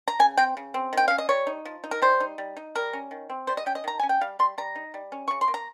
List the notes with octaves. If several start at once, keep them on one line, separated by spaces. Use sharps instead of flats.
A#5
C#3 G#5
C4 G5
C#3
C4
D#3 G5
C#4 F5
D#5
G3 C#5
D#4
F3
D#4
A#4
G3 C5
D#4
G3
D#4
G3 A#4
C#4
D#3
C4
G3 C5
D#5
C#4 G5
D#5
D#3 A#5
C#4 G#5
G5
G3 F5
G3 C6
G3 A#5
D#4
G3
C#4
C#3 C#6
C6
A#3
A#5